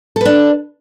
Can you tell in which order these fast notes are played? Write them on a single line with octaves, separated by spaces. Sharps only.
A4 B4 D4